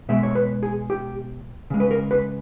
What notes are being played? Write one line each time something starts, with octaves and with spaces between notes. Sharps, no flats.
B2 G#3 E5
C#5
B4
G#4
G4
C#3 G#3
B4
A#4
B4